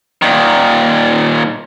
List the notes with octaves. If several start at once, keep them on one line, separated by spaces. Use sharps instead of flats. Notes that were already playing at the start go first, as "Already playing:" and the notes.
A#2 D#3